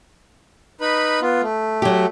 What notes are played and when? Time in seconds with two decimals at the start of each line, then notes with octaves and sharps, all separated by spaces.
0.81 D#4 B4 B5
1.22 B3 F4
1.42 A3
1.82 F#3 G4